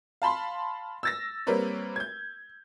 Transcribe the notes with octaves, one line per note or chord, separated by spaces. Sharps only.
F5 A5 B5 C6
E6 A6 A#6
G3 A#3 C4 A#4 B4 C#5
G6 G#6